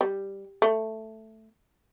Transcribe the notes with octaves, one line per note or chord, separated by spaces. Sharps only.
G3
A3